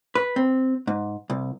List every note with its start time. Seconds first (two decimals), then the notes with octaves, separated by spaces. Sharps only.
0.15 B4
0.36 C4
0.87 G#2
1.30 C2